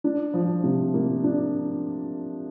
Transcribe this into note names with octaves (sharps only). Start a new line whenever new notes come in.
D4
F3
C3
A#3
D4